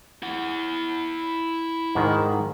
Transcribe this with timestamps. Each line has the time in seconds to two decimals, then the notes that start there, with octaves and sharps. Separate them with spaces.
0.23 E4 F#5
1.95 G#2 D#3